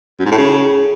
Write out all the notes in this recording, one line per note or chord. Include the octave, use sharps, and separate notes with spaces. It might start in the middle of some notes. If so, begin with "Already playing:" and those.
F#2
G#2
A2
C#3